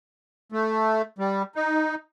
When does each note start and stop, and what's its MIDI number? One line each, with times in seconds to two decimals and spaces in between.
0.52 1.02 57
1.19 1.43 55
1.56 1.95 63